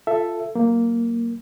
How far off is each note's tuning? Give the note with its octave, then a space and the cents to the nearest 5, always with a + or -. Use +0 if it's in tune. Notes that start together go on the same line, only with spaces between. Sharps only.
F4 +0 A4 +0 E5 +10
F#3 +30 A#3 +0